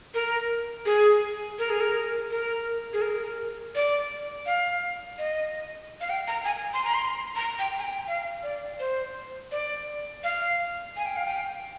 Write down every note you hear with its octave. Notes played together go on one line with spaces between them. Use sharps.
A#4
G#4
A#4
G#4
A#4
A#4
G#4
A#4
D5
F5
D#5
F5
G5
A#5
G#5
C6
A#5
C6
A#5
G5
G#5
G5
F5
D5
C5
D5
F5
G#5
G5
F5
G5